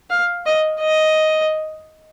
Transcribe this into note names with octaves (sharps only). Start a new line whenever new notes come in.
F5
D#5
D#5